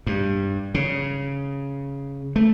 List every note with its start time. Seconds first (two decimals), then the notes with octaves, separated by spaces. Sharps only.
0.07 G2
0.74 C#3
2.36 A3